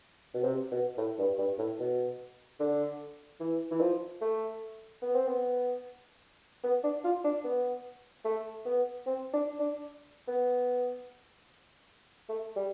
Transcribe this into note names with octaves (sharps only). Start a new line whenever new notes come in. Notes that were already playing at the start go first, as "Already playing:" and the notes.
B2
C3
B2
A2
G2
G2
A2
B2
D3
E3
E3
F3
A3
B3
C4
B3
B3
D4
F4
D4
B3
A3
B3
C4
D4
D4
B3
A3
G3